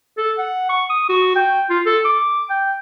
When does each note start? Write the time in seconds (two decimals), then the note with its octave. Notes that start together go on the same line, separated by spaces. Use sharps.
0.17 A4
0.38 F#5
0.69 C#6
0.90 D#6
1.09 F#4
1.35 G5
1.70 F4
1.86 A4
2.05 D6
2.50 G5